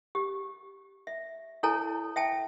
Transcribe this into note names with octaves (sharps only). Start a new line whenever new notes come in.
G4
E5
E4 A4 C#5 G#5 A#5
E5 G5 A5